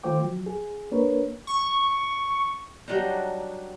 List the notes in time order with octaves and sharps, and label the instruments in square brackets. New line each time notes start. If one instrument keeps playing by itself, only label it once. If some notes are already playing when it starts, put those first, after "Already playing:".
[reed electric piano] D#3 A3 F4 C5 G5 D6
F3 F#3
G#4
A#3 D4 A#4 B4 C#5
[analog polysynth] C#6
[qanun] F#3 G3 D4 D#4